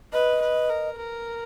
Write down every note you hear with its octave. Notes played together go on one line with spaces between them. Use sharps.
B4 D#5
B4
A#4
A#4